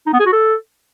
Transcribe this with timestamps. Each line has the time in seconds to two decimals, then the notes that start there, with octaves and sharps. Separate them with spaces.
0.07 D#4
0.13 B3
0.20 G#4
0.26 F#4
0.33 A4